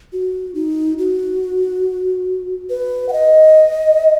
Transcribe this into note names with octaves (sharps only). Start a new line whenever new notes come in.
F#4
D#4
F#4
B4
F#5
D#5